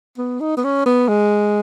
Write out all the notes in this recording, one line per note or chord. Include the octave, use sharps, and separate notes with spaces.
B3
D#4
B3
C#4
B3
G#3